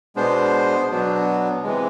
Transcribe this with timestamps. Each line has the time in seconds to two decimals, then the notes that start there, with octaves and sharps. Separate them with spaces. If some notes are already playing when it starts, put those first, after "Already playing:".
0.16 B2 G#3 B3 D4 C5
0.90 B2 F#3 B3 D4
1.63 C3 E3 G#3